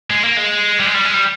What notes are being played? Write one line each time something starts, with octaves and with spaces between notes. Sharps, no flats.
G#3
A#3
G#3
G3
G#3
G3
G#3
G3